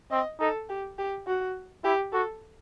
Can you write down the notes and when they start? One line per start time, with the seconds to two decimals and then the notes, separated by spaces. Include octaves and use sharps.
0.11 C4 D#5
0.40 D#4 A4
0.69 G4
0.98 G4
1.27 F#4
1.84 E4 G4
2.13 F#4 A4